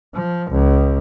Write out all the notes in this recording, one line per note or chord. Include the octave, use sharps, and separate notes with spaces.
F3
C#2